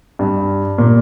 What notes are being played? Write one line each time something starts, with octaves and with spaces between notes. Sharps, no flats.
G2
A#2